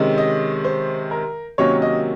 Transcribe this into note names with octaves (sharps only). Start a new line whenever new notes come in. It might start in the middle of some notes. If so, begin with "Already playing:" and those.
Already playing: C3 D#3 G#3 C#4
D#5
C5
A#4
C3 D#3 F#3 A#3 C#4 C#5
D#5